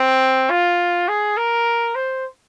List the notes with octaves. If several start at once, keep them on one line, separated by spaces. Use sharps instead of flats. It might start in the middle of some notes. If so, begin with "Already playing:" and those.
Already playing: C4
F4
G#4
A#4
C5